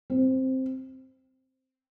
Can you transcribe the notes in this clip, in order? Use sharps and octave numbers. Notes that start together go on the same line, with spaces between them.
C4